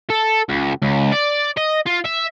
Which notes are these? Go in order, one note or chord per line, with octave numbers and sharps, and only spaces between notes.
A4
C#2
C#2
D5
D#5
F4
E5